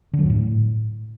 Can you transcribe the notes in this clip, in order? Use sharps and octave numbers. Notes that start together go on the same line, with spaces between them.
D3
F#3
F#2
A2